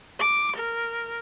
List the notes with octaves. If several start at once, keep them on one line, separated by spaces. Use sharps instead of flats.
D6
A#4